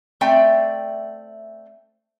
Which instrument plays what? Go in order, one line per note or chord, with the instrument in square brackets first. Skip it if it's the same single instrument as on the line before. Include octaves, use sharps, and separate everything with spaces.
[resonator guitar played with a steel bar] A3 C4 D5 E5 G5